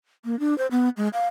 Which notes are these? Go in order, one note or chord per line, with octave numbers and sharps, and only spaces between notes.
A#3
D4
C5
B3
G#3
F5